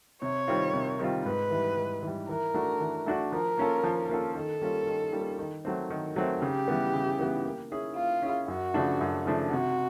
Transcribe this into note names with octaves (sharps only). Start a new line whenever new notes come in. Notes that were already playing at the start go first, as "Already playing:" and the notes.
C3 C#5
D#3 G3 C4 F4
C3
D#3 G3 C4 F4
G#2 B4
E3 G3
G#2
E3 G3
E3 A#4
A3 D4 F#4
E3
A3 D4 F#4
F3 A#4
A#3 C#4 F4 A4
F3
A#3 C#4 F4 A4
D#3 A4
G3 A#3 C#4 F4
D#3
G3 A#3 C#4 F4
D#3
F#3 A3 C4
D#3
F#3 A3 C4
C#3 G4
E3 G3 B3
C#3
E3 G3 B3
A#3
C#4 E4 G#4
A#3 F4
C#4 E4 G#4
F#2 F#4
C#3 F3 A3 D4
F#2
C#3 F3 A3 D4
C3 F#4